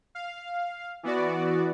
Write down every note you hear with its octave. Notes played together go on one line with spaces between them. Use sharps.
F5
E3 B3 F#4 D5